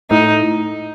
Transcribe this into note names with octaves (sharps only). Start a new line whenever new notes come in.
A2 D#4